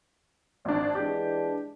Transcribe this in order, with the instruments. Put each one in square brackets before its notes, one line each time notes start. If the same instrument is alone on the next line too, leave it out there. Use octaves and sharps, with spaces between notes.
[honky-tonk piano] G#1 D4 [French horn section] D5
[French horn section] E3 G#3 D4 [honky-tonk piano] G4